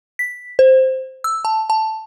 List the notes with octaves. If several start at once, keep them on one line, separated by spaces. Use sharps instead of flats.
B6
C5
E6
A5
A5